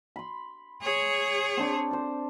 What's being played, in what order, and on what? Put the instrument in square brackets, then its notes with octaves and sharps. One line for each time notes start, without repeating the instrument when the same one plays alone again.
[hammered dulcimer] B5 C6
[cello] G#4 C#5
[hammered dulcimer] C4 D4 G5
A4 C5